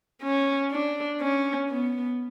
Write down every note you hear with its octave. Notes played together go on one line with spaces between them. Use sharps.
C#4
D4
C#4
B3